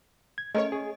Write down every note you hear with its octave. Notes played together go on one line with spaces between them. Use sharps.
G#6
A3 C#4 G#4 A#4 C#5 D#5
G#4